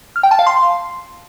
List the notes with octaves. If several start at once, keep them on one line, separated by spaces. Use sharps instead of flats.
F6
G5
A5
F5
C6